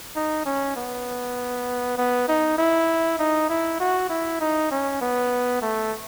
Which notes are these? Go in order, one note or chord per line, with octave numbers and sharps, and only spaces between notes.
D#4
C#4
B3
B3
D#4
E4
D#4
E4
F#4
E4
D#4
C#4
B3
A3